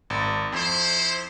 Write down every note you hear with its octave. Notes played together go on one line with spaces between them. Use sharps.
G#1
F2 E4 C5